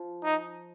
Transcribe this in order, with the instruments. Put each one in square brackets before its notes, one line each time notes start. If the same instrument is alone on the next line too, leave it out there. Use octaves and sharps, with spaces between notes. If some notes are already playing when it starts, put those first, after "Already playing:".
Already playing: [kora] F3
[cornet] D#4